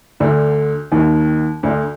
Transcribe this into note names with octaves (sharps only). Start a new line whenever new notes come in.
D2 D3
D#2 D#3
D2 D3